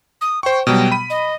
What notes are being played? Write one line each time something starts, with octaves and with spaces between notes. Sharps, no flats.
D#6
C5 G5 C#6
B2 F#3 G3 G5
B5 D#7
D#5